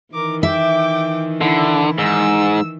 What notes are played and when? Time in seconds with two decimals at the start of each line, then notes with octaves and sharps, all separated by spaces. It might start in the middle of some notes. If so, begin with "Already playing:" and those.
0.14 D#3 E3 A#4 D6
0.43 E5 G5 D6
1.41 D3 E4
1.98 G#2 E6